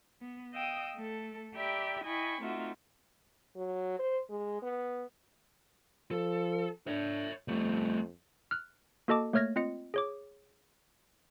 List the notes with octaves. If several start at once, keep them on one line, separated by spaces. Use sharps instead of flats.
B3
D#5 F5 G5 D#6 E6
A3 A4
G4 D5 E5 G5 A#5 B5
E4 D#5 G5 G#5 B5 C#6
A3 C4 D#4 F4 F#4 E5
F#3
C5
G#3
B3
F3 A4
D4 C#5 E5
F2 G3 A3
F6 F#6
A#3 F#4 A4 D#5 A5 D6
A3 A#3 C#5 F6 G#6 A#6
C4 F4 D#5 C#7
G#4 C#5 D6